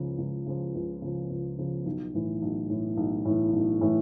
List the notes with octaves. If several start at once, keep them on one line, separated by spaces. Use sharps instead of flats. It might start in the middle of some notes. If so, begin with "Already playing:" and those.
Already playing: C#2 C#3 F3
C#2
C#3 F3
C#2
C#3 F3
C#2
C#3 F3
B1
A2 E3
B1
A2 E3
B1
A2 E3
B1
A2 E3